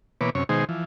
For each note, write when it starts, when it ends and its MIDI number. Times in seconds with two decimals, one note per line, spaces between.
0.21 0.30 47
0.21 0.30 52
0.21 0.30 58
0.21 0.30 71
0.21 0.30 73
0.21 0.30 86
0.35 0.44 42
0.35 0.44 48
0.35 0.44 61
0.35 0.44 73
0.49 0.65 47
0.49 0.65 51
0.49 0.65 56
0.49 0.65 63
0.49 0.65 68
0.49 0.65 72
0.69 0.84 52
0.69 0.84 53